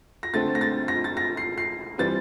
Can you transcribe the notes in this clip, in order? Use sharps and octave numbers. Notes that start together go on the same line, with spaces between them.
A#6
D3 A3 C4 A6
A#6
A6
A#6
A6
A#6
C7
C7
E3 G3 C4 A6